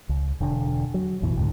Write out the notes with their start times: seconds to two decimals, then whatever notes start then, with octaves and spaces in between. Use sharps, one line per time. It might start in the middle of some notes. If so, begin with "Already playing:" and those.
0.09 C#2
0.40 E1 D3
0.94 F#3
1.22 A1 E2 B2 E3
1.37 C#2 G#2 D3